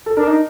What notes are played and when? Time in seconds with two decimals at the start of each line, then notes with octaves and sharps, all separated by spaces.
0.06 A4
0.17 D4 A#4
0.27 D#4